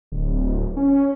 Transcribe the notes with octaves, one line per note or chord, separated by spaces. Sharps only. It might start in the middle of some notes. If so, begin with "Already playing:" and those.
D1
C#4